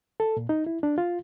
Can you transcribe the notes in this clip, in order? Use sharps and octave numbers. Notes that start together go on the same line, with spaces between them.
A4
A#2
D#4
E4
D4
F4